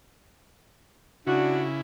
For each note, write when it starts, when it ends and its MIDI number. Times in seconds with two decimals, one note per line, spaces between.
1.27 1.81 49
1.27 1.65 62
1.27 1.81 64
1.27 1.65 66